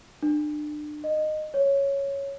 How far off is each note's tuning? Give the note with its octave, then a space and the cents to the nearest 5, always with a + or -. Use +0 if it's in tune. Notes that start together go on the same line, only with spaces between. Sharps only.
D4 +35
D#5 -15
C#5 +0